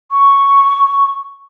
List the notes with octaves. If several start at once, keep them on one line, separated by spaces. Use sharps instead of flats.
C#6